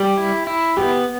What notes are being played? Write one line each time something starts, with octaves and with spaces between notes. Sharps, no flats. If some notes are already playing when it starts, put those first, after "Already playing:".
Already playing: G3 G4
E4
E4
B3 G4